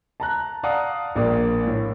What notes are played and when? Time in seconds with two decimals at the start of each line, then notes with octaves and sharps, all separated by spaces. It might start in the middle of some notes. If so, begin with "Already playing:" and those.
0.20 A5 A#5 F#6
0.63 D5 F5 F#5 A5 A#5 D#6
1.16 A#1 A#3 D5 G5 D#6
1.66 A2